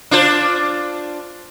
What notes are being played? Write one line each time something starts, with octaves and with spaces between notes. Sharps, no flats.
D4 F4 C5